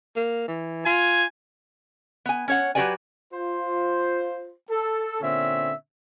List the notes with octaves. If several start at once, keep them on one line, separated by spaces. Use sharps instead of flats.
A#3
E3
F4 G#5
B3 G#5
C#4 C#5 F#5
F#3 F#4 G4 B4 D5 G#5
F4 C5
A4
A#2 D3 C4 C#4 E5